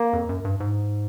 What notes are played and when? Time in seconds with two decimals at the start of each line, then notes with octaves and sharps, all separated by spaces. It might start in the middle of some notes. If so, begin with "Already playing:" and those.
Already playing: A#3
0.13 F2
0.29 F#2
0.45 G2
0.60 G#2